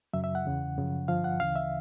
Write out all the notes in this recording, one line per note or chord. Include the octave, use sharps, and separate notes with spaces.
F#2 C#3 F#3 E5
E5
F#5
E2 C#3 E3
F#2 C#3 F3
G2 D3 F3 F5
F#5
D2 C#3 E3 F5
E5